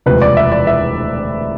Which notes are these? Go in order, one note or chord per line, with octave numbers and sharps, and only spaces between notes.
E1 D2 C3 F3 B4
D5
E5
D5
E5